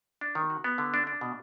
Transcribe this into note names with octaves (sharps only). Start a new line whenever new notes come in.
D4
D#3
F#4
B3
D3
D4
D4
B2